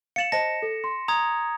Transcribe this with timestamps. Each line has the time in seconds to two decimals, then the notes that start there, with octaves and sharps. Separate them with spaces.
0.16 F5 A6 C#7 E7 F#7
0.32 C5 D#5 A5 A#6
0.62 A4
0.84 C6
1.08 A#5 D#6 G#6